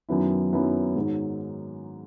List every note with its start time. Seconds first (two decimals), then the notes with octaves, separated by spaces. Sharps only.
0.09 F#2 D#3 F#3 B3 E4
0.53 F#2 D#3 F#3 B3 E4
0.96 G#2 D#3 F#3